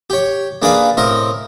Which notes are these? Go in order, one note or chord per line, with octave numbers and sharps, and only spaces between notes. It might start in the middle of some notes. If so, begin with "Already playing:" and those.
G4 C#5
A#3 D4 G#4 B4 D5 F5
A2 C4 A#4 D#5